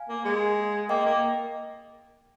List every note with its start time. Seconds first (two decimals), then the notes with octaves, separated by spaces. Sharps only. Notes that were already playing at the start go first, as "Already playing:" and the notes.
Already playing: F5 G#5
0.09 A#3
0.25 G#3
0.89 A#3 D#5 G5
1.06 A#3